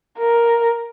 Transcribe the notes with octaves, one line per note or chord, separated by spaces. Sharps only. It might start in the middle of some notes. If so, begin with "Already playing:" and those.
A#4